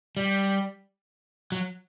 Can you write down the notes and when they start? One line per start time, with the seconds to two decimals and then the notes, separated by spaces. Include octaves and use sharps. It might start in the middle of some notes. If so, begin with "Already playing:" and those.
0.17 G3
1.52 F#3